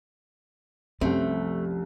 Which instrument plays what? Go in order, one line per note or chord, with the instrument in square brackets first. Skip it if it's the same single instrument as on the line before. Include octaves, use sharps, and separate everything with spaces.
[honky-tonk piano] C2 F#2 [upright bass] F3 [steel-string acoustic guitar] A3 [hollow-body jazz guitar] C4